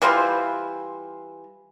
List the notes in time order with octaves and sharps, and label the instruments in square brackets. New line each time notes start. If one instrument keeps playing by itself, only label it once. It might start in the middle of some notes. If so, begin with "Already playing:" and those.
[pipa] E3 G3 F4 C5